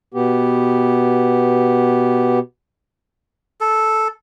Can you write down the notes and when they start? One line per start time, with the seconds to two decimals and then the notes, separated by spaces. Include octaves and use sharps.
0.14 B2 B3 G4
3.60 A4